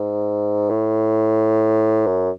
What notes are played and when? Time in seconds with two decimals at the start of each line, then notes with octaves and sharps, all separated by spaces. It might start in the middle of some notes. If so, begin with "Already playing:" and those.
Already playing: G#2
0.70 A2
2.06 F#2